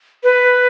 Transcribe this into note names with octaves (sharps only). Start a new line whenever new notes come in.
B4